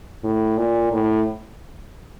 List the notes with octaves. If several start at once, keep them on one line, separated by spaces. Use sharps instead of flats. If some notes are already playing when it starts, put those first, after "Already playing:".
A2
A#2
A2